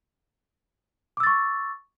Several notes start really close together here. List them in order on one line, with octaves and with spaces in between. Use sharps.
D6 E6 A6 C#6